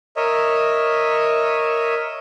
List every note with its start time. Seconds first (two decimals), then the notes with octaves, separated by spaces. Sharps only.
0.16 A#4 C#5 D#5 E5